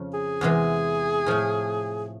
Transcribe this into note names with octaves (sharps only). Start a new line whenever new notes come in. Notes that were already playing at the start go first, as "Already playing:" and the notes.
Already playing: F2 C#3 F3
G#4
E2 C3 E3 G#3
A2 F3 A3